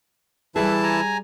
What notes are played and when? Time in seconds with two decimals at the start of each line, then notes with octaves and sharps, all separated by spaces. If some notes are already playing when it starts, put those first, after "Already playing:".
0.56 E3 G3 E4 G#4 A4 B4 A5
0.83 G#5 A#5